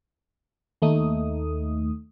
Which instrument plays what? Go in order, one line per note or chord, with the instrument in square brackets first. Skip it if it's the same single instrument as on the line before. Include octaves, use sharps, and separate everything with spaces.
[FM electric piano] D#2 A3 D#4 D#6